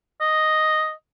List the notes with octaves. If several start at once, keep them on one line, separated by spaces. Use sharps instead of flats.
D#5